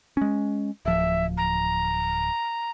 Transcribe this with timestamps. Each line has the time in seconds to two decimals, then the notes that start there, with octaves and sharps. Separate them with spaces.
0.17 G#3 C#4
0.85 D1 F3 E5
1.37 A#5